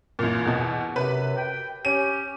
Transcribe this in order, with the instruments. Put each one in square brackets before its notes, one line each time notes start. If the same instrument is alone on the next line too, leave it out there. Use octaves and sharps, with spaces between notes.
[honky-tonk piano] A1 A#2
E2 B2
[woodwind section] F#2 C3 [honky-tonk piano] B4
[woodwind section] G5
[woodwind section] C#4 G4 [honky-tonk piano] D#7